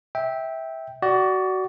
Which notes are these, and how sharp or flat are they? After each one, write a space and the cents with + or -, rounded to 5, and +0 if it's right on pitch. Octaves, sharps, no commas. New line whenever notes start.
E5 -15 G5 +0
F#4 +20 D5 +0